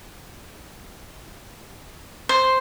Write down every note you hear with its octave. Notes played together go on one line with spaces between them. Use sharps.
C5